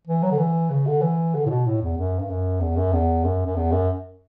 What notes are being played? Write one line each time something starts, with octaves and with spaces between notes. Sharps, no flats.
E3
F#3
D3
E3
C#3
D3
E3
D3
A2
B2
A2
E2
F#2
G2
F#2
E2
F#2
E2
F#2
F#2
E2
F#2